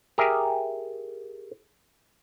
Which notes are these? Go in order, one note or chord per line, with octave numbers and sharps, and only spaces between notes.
G4 G#4 A#4 E5